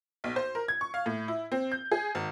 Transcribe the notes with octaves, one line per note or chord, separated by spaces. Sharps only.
B1
C5
A#4
G#6
C#6
F5
A2
E4
C4
G6
G#4
G#1